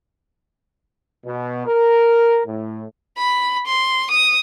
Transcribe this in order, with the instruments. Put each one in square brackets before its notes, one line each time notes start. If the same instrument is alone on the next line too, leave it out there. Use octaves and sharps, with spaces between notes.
[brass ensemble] B2
A#4
A2
[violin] B5
C6
D#6